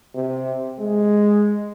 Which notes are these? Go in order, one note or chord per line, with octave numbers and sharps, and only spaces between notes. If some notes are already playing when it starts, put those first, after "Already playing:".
C3
G#3